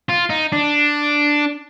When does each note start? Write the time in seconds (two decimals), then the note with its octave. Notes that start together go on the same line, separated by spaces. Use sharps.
0.09 F4
0.30 D#4
0.52 D4